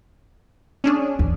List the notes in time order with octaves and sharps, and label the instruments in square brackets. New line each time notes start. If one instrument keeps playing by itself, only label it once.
[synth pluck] C#4 D4 G#4
[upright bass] E2